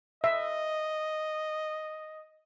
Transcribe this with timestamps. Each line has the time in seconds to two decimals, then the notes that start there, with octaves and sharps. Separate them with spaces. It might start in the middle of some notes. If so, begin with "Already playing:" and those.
0.24 D#5 E5